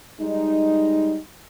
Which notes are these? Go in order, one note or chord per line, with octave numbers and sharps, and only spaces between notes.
G3 G#3 D#4